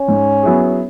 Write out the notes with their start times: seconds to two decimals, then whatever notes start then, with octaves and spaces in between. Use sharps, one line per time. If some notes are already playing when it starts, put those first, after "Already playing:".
Already playing: C#4
0.08 G#2
0.43 F#3 B3 E4 G#4